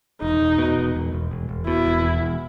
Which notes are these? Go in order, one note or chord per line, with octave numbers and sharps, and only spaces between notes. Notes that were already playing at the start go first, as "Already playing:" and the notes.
E1 D#4
E1
B2
E1
E1
E1
E1
E1
B2 E4
E1
E2
E1